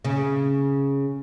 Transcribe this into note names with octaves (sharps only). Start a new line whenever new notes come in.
C#3